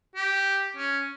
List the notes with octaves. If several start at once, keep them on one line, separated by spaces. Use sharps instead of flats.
G4
C#4